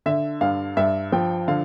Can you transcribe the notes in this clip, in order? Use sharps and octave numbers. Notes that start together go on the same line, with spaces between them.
D3 E5
G2 F5
G2 E5
F3 G5
D3 F5